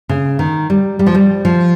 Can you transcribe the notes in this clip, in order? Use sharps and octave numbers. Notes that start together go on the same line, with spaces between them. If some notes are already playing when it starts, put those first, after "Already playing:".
C#3
D#3
G3
G3
F3
G3
F3